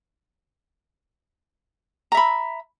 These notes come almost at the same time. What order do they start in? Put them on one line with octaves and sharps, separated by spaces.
A#5 E5 B5